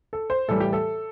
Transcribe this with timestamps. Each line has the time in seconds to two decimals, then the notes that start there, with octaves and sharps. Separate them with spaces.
0.13 A4
0.30 C5
0.48 A2 E3 G3 A4
0.60 G4
0.73 A4